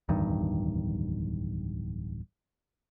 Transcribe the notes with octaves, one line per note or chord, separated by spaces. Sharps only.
D1 E2 G2 D#3